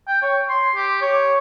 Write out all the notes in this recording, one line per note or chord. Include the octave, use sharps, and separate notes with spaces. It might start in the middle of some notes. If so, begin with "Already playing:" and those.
G5
C#5
C6
G4
C#5